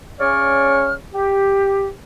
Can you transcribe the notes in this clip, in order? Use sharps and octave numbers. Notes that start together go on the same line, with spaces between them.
C#3 C#4 C#5 D5 F6
G4